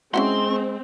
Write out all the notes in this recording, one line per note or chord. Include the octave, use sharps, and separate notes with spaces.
G#3 C4 C#4 E4 F#4 C6